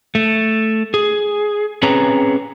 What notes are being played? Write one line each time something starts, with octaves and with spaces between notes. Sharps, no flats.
A3
G#4
C4 C#4 G#4 B4 C#5 A#5